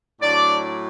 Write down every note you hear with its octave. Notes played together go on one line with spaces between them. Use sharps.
A2 F#3 D4 D5